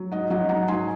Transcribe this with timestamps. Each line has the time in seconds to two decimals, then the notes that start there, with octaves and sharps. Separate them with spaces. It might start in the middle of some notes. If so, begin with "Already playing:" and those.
Already playing: F#3
0.11 G#2 D#5 F#5
0.30 F#3 D#5 F#5
0.49 G#2 F#5 A#5
0.68 G#2 G#5 C6